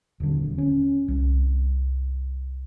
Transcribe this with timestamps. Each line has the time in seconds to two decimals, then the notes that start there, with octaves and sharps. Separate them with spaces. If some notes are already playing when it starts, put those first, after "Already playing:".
0.20 D#1 D3
0.58 C#4
1.08 C2